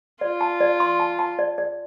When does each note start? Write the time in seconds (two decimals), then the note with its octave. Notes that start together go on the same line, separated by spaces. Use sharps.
0.21 F4 D5
0.41 A5
0.61 D5
0.80 C6
1.00 A5
1.19 A5
1.39 D5
1.58 D5